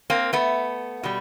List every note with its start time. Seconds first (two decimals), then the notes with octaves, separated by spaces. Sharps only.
0.10 A#3 C4
0.33 A3 B3
1.03 B2 G3